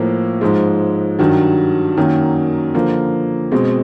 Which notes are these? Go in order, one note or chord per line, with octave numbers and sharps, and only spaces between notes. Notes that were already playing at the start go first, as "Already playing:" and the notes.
Already playing: A2 F3 A#3
G#2 F3 G#3
G2 D#3 F#3
F#2 D#3 F#3 A#3
D3 F3 A#3
B2 G#3 C4